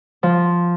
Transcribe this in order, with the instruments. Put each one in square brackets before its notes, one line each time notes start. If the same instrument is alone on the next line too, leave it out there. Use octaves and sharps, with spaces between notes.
[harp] F3